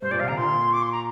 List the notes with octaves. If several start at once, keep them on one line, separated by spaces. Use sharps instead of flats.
G2 C5
A#2 D5
C3 F5
D3 A#5
A#2 C6
D6
C6
A#5